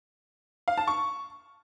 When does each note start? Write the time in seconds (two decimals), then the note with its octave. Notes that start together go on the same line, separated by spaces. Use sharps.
0.68 F5
0.78 A5
0.87 C#6